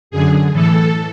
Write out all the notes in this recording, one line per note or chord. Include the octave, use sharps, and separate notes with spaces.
F#2 D3 G#4
A2 E3 A4